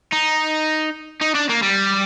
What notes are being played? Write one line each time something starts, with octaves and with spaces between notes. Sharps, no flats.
D#4
D#4
D4
A#3
G3